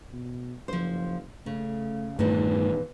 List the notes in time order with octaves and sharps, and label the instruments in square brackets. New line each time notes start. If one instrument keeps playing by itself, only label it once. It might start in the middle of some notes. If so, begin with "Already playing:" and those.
[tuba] B2
[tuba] F#1 [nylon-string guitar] F3 C5
[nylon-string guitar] C#3 [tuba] A3
[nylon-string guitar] E2 A#2 E3 [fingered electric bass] G2 A3 [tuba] D#3